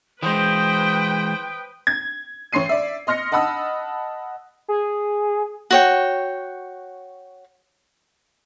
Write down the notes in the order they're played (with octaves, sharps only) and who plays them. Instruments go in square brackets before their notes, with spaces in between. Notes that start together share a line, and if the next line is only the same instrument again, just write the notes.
[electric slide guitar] E3 G#3 [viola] B4 G5 [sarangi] C5 [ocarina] D#6
[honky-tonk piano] G#6
A1 C#5 C6 C7 D#7
D5 E5
D#5 C6 F6 A#6 C#7
D#5 F#5 A5 B5 D#6 E6
[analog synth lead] G#4
[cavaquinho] F#4 C#5 G5